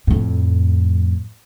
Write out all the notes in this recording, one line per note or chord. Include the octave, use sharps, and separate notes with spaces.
F2 A2